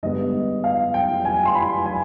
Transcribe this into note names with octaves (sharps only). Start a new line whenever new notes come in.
G2 D3 G#3 B3 D#5
F5
G5
G#5
C6
B5
G#5